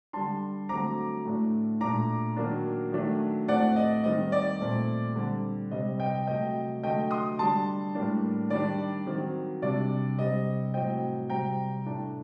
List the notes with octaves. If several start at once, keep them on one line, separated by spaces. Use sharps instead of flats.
D3 G3 D4 A5 C6
D3 F#3 A3 C4 A#5 D6
A2 A3 D4
A#2 A3 D4 A#5 D6
D#3 F#3 A#3 D4
D#3 F#3 A3 D4
A2 A3 C4 D5 F#5
D#5
D#3 G3 C4 D#5
D5
A#2 A3 C4
D3 G3 C4
C3 G3 C4 D#5
D#5 G5
C3 F#3 A3 D#5 G5
D3 F#3 A3 D#5 G5
C6 D#6
D3 G3 D4 A5 C6
A2 G3 A#3 D4
D#3 G3 D4 D5
D#3 F#3 C4
C3 G3 D4 D5
C3 G3 C4 D#5
A2 F#3 C4 D#5 G5
C3 G3 C4 G5 A#5
A2 A3 D4